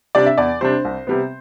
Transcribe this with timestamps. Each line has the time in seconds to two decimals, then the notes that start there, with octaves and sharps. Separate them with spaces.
0.15 C3 G3 D4 D5
0.26 E5
0.38 E2 D5
0.61 C3 G3 D4 C5
0.85 C2
1.07 C3 G3 B3